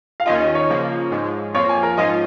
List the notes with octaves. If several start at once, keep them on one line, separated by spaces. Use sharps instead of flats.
F5
D#2 D#3 C#4 F4 D#5
D#5
C#5
C#3 F3 A#3
G#2 F3 G#3
F2 F3 A#3 F4 C#5
G#5
A#4
G#2 F3 C#4 F4 D#5